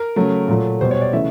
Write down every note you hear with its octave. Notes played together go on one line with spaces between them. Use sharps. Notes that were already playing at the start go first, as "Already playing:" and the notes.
Already playing: A#4
C#3 F#3 A3
A#2 F#3 A3
B2 G3 C5
C#5
D5
C#3 E3 A3 E5